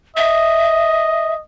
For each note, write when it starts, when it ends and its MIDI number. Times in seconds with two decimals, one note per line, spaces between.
0.17 1.41 75
0.17 1.34 76